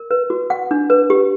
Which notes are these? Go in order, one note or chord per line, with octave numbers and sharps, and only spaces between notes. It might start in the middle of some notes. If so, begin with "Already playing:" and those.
Already playing: A#4
B4
F#4
F#5
D4
B4
G4